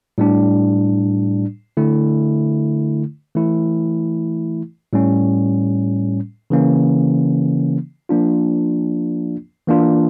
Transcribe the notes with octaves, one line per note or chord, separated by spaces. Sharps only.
A2 G3 D4
D3 A3 E4
E3 A3 E4
A2 G3 C#4
C#3 E3 A#3 C#4
F3 A#3 D4 F4
E3 A#3 D4 F4